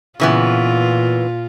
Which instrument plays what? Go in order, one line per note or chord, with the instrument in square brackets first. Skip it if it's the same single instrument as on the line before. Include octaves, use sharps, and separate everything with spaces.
[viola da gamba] A#2 F4 [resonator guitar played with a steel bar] C#3 E3 B3